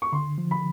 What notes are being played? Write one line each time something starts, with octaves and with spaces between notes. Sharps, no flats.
C#6
D3 C6
F3
B5